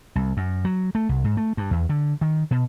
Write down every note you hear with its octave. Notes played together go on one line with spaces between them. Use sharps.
C2
F#2
F#3
A3
C2
G#2
A3
G2
E2
D3
D#3
B2